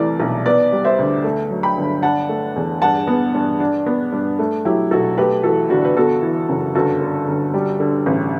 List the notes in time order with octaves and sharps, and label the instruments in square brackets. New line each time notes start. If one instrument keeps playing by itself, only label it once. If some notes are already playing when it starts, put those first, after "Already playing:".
Already playing: [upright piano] C2 E3 A3 D5
B1
B3 B4 D5
G3
C5 E5
D2
A3
F#3
G5 B5
G1
D4 F#5 A5
A3
E2
G2 F#5 A5
B3
G2
D4
B3
G2
A3
F#3 E4 G4
B1 F#4 A4
A3 G4 B4
E3 F#4 A4
G1 D4 F#4
B4
B3 F#4 A4
E3
F#1
G1 F#4 A4
D3
G1
G3
D3
A1